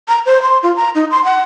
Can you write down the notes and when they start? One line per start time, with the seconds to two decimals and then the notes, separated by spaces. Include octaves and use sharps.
0.08 A#5
0.26 C5
0.42 C6
0.63 F4
0.76 A#5
0.95 D#4
1.11 C6
1.25 F#5